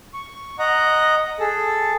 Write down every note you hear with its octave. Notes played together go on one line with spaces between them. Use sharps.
C#6
D#5 F#5 A#5
G#4 A4